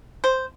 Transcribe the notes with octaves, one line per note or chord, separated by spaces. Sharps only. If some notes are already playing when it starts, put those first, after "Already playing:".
C5